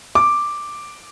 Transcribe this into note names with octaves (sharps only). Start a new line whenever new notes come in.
D6